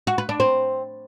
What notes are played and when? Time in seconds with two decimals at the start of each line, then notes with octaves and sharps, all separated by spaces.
0.07 F#4
0.18 B4
0.29 D4
0.40 C4